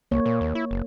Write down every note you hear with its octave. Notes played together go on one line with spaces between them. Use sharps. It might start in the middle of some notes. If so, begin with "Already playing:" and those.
C2 A#3 C#5
A#2 C#5
D#2
E4
F#1